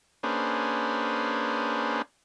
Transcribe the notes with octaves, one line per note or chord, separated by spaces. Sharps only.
A#3 C#4 D4 G#4 B4 C5